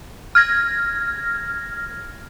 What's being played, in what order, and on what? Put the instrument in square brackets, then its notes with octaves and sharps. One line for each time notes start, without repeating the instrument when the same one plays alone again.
[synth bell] F6 G#6 A#6